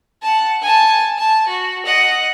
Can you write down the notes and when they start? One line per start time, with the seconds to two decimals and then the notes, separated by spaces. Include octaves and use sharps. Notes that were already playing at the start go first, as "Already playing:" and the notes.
0.22 F#5 A5
0.62 G#5 A5
1.18 A5
1.47 F#4
1.85 D#5 F#5